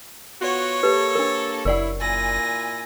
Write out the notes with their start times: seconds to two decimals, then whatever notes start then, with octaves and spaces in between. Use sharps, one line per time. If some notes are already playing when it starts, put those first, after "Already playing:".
0.41 B3 F4 F#4 C#5
0.83 A#3 G4 A4 B4
1.15 D4 A#4
1.65 F#1 E4 A#4 D5 F#5
2.01 A#2 E4 G#5 A#6